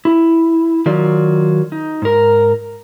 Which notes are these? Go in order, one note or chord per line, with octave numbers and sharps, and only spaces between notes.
E4
D#3 F#3 F4 D5
D#4
G#2 A#4